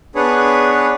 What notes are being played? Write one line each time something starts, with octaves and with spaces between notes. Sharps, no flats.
B3 D4 G#4 B4 C#5